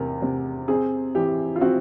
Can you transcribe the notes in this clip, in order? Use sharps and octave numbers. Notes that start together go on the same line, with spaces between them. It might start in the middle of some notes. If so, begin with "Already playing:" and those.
Already playing: E2 C3 A#4
C3
C4 G#4
E3 G4
F4
C4 F#4